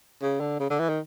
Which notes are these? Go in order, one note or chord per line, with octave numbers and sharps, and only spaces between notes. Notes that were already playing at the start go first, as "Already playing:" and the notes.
C#3
D3
C#3
D3
E3
D#3